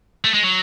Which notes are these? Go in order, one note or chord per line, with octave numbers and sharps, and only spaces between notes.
A3
G#3
F#3